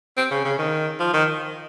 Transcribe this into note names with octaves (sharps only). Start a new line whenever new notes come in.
C4
C#3
C#3
D#3
F3
D#3